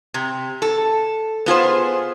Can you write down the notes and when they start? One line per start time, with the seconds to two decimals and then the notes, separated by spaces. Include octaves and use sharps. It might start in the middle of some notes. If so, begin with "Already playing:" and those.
0.14 C3
0.62 A4
1.46 B3 F4 G#4 C5